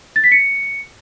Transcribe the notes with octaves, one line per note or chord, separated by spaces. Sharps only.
A6
B6
C#7